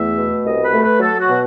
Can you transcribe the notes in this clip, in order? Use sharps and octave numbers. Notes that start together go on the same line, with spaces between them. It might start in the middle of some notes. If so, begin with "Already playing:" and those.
Already playing: E2 A3 E5
B2
C2 D#5
B4
A3
B4
F#3 A4
F#4
B2